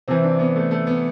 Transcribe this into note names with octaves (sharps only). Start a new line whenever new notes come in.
C3 E3 C4
D4
B3
A3
A3
B3